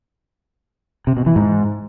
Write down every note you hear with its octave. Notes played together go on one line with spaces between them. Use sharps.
C3
B2
E3
G#2